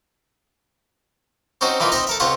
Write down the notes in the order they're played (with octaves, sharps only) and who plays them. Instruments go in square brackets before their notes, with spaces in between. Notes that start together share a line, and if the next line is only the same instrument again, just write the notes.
[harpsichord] C4 C#4 D#4 F#4 C5
E3 A#3 D#4 F4
C4 D#4 D#5 E5 A#5
A4 A#4 E5
C#2 C4 F4 C#5 F#5